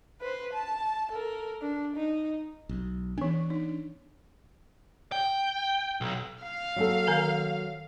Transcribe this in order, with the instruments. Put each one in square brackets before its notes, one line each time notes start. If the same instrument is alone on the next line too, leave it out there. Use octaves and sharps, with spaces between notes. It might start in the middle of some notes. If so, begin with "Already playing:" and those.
[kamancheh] B4 C5
A5
A4 A#4
D4
D#4
[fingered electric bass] B1
[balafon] E3 B3 [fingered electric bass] D4
[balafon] D#4
[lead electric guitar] G5
B1
[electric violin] F5
[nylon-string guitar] F#3 A#3 A4
[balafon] D#3 A#4 G#5